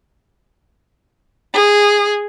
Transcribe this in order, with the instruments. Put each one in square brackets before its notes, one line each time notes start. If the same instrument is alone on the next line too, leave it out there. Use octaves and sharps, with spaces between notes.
[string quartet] G#4